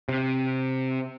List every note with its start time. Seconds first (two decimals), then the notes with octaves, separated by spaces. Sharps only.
0.09 C3